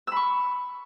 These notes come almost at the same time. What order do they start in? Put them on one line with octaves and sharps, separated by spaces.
E6 B5 C#6